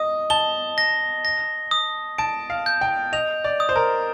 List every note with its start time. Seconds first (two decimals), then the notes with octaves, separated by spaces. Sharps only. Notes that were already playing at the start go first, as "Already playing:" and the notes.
Already playing: D#5 D#6
0.30 A5 G7
0.78 A#6
1.25 A#6
1.71 D#6
2.18 A5 D7
2.50 F5
2.66 G6
2.81 G5
3.13 D#5 F7
3.44 D5
3.60 D#6
3.69 C5
3.76 A#4